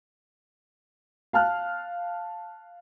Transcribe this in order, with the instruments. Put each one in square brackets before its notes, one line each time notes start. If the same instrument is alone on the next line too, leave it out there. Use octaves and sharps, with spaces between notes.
[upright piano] F5 A5 F6 F#6